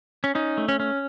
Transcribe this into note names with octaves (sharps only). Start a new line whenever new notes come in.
C#4
C#4 D#4
A3
C#4
C#4